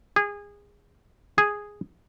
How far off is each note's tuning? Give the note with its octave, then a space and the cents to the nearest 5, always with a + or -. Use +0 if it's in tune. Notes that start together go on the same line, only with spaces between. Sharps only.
G#4 -25
G#4 -5